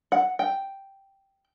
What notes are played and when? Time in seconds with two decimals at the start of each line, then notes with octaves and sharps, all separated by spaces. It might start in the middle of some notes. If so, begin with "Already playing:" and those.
0.12 F#5
0.39 G5